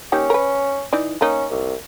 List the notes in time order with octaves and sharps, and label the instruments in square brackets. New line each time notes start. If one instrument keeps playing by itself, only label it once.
[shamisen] A#3 D#4 G4 [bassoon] C#4
[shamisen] A#4 B4
E3 D#4 D5
[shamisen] A#3 D#4 [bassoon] C#4
[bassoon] C2